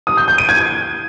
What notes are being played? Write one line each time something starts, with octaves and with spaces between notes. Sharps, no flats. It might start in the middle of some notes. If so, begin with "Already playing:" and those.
D#6
G6
G6
D#7
G#6